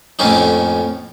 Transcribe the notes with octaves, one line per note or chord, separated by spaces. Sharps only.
F2 A2 A3 A#3 C#4 D#4